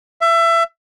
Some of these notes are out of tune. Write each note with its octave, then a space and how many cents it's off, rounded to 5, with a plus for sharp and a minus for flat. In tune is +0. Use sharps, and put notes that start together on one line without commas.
E5 +25